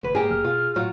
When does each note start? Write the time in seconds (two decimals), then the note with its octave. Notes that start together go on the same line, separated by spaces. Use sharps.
0.03 F1 D2 B4
0.15 G#2 A#3 G4 G#4
0.30 F#1 F6
0.44 B2 F4
0.76 A2 F#3 F4